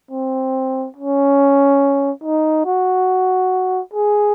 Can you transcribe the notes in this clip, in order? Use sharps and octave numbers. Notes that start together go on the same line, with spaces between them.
C4
C#4
D#4
F#4
G#4